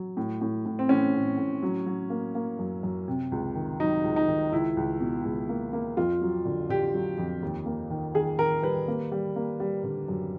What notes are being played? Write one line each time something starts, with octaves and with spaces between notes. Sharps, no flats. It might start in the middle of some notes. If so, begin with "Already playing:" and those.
Already playing: F#3
A2
A2
A2
C4
A2 C#4
A2
A2
F#3
F#3
A#3
A#3
F#2
F#2
C3
C#2
D#3
F#3 D#4
C#2
D#4
D#3
C#2 E4
C#2
B2
C#2
A#3
A#3
F2 F4
F#3
D3
D3 G4
F#3
F2
D#2
A#3
D#3
D#3 G#4
D#3 A#4
G3 B4
A#3
G3
A#3
G3
D3
F#2